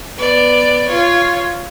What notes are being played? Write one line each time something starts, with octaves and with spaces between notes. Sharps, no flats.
B3 D5
F4 C#5